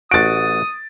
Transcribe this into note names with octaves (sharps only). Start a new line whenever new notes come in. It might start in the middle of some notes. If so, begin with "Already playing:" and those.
A1 F#4 D#6 A6 D7